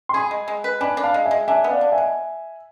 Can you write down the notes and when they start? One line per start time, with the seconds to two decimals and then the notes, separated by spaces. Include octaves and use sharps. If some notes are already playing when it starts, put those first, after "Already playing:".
0.09 C6
0.14 G#4 G#5 B5
0.31 G#3
0.48 G#3
0.64 B4
0.81 D4 G#5 B5
0.97 D4
1.03 F5 A5
1.14 G#3
1.25 E5 G#5
1.31 G#3
1.48 D4 E5 G#5
1.64 B3
1.70 D5 F5
1.81 D4
1.92 E5 G#5
1.98 B2